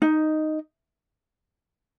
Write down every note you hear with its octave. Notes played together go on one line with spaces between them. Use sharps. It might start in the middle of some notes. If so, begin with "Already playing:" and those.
D#4